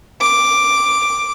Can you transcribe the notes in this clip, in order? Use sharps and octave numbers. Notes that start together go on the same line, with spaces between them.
D6